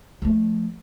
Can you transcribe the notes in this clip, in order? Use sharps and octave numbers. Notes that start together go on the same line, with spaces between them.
F3 A3